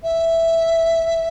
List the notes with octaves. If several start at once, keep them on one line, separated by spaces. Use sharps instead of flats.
E5